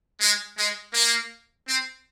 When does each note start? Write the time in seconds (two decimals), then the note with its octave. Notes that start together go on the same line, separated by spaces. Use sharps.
0.21 G#3
0.57 G#3
0.93 A#3
1.66 C4